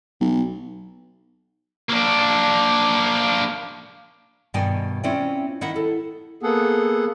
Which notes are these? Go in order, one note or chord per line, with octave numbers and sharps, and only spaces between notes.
B1
A#3 D4
G2 B2 D#3 D5 G5 G#5
C4 C#4 E4 F4 D5 G5
D#3 E4 D#5 F#5
A4
A#3 B3 G#4 A4 F#5